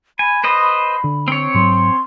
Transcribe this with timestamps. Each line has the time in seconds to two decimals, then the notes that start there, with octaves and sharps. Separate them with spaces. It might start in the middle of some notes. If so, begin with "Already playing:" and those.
0.19 G#5 B5
0.44 B4 C5 D#5
1.04 D3
1.28 C4 C#5
1.54 G#2 F#3 C6